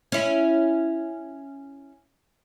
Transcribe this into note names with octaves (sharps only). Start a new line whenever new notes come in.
C#4 E4